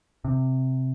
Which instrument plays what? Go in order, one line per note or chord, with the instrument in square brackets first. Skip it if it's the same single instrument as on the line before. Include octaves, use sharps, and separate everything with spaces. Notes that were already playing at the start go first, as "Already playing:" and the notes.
[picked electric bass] C3